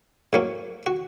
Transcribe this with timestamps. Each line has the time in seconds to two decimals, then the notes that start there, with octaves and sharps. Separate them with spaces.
0.33 G#2 F#3 A#3 C#4
0.86 F#4